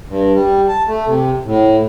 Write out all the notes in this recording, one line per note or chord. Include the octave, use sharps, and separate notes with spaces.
G2
G3
A5
A3
C3
A2